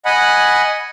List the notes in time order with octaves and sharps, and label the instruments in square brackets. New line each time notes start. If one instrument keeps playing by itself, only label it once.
[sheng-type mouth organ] D#5 F#5 G#5 B5